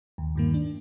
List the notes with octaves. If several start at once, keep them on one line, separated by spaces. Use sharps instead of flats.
D#2
G2 D#3 A#3
D4